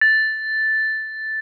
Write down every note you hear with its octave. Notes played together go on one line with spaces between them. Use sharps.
A6